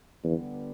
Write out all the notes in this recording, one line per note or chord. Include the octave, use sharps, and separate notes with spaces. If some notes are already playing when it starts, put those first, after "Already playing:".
E2 D3 G3 B3